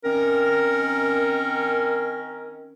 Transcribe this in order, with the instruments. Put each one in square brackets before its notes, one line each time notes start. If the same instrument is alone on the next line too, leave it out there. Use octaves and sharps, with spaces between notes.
[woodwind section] D#3 C4 C#4 [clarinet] A#4